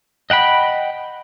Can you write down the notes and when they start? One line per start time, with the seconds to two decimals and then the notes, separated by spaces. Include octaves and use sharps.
0.30 D#5 F#5 G5 B5